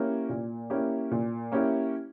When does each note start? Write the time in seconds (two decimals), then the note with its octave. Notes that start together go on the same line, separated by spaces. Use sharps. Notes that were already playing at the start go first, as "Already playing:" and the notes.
Already playing: A#3 C#4 E4 G4
0.29 A#2
0.70 A#3 C#4 E4 G4
1.11 A#2
1.52 A#3 C#4 E4 G4